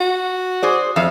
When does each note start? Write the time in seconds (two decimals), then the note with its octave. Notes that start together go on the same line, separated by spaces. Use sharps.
0.01 F#4
0.63 G#4 C5 D5
0.96 F2 E5 F5